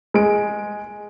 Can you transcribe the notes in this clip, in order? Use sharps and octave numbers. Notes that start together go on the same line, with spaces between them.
G#3 D7